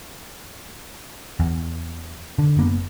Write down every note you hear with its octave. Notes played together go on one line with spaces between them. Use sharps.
E2
D3
F#1 A#3 B3